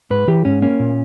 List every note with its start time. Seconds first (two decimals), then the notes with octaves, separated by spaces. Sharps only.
0.10 G#2 B4
0.28 E3 G4
0.45 G#2 C#4
0.62 A#3 C#4
0.80 A#2